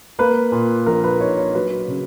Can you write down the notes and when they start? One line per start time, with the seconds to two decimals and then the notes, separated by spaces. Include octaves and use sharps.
0.19 A#3 B4
0.52 A#2
0.86 A#1 A#4
1.04 B4
1.20 D#4 C#5
1.37 C#5
1.55 F#3 B4
1.88 C#3